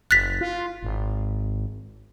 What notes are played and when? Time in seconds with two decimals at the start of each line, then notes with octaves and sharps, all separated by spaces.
0.11 F#1 F#6 A6 B6
0.41 F4
0.83 G#1